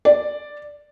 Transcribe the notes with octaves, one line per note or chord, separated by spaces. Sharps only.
D5